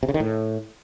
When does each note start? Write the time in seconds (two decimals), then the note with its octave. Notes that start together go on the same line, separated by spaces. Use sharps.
0.03 C3
0.09 C#3
0.14 D#3
0.20 A2